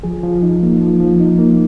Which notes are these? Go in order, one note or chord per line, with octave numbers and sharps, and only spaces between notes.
F3 G#4
F3
D#4
A#3
F3
F3
D#4
A#3